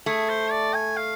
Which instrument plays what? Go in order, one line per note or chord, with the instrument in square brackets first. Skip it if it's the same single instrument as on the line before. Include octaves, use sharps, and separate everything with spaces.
[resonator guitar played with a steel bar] A3 [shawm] G#4
[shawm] C5
D5
G#5
F5